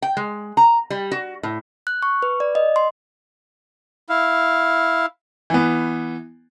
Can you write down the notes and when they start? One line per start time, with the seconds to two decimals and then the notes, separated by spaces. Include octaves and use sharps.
0.02 G5
0.17 G#3
0.57 A#5
0.90 G3
1.12 F#4
1.43 A2
1.87 F#6
2.03 C#6
2.22 B4
2.40 D5
2.55 D#5
2.76 C6
4.09 E4 F5
5.50 E3 B3